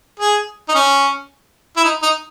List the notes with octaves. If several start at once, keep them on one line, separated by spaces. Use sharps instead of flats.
G#4
D#4
C#4
E4
D#4
D#4